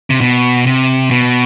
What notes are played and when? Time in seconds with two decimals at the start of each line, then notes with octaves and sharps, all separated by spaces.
0.10 C3
0.21 B2
0.67 C3
1.11 B2